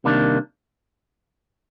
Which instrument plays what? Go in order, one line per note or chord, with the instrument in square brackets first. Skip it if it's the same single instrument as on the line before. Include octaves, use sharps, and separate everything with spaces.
[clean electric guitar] C2 C3 D#3 A#3 D4